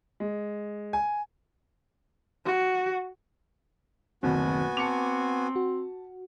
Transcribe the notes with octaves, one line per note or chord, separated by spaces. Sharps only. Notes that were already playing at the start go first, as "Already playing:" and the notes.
G#3
G#5
F#4
F#1 D2 B2 D#3 B3 C4 F#4 G#5
C4 A5 D6 C#7 F7
F#4